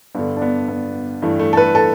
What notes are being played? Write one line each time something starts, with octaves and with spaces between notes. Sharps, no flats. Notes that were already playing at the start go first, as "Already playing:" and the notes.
G2 D3 B3
D4
B3
B3
G2 E3 A3
A3
A4
B4
A4